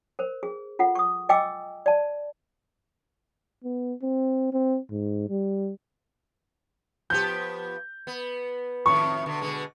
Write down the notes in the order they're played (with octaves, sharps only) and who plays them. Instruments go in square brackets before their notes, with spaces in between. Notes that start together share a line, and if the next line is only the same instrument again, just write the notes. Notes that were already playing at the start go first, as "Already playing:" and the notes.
[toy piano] A#4 C5
G#4
F4 A4 F#5
C#6 D#6
D#5 G5 G#5 D6 E6
D5 A5
[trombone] B3
C4
C4
G#2
G3
[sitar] F3 B3 G4 [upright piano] G6
[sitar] B3
[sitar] F2 A2 D#3 [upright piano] C#6
[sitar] B2 D3
B2 D3 G#3